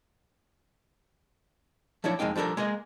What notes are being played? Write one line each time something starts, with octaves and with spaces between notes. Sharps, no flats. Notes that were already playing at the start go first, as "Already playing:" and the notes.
F3 F#3 D4 E4 C#5
F2 E3 G#3 A#3 D#4 G5
F3 G3 D4 A4 A#4
G#3 A#3 G#4 D#5